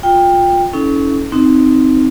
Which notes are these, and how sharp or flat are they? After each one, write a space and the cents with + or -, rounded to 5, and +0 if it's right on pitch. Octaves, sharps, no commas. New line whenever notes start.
F4 +20 G5 +15
C#4 +10 E4 -40 A4 -25
C4 +0 D#4 +0